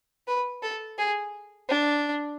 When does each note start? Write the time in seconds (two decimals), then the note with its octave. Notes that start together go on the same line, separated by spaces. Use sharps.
0.27 B4
0.62 A4
0.98 G#4
1.68 D4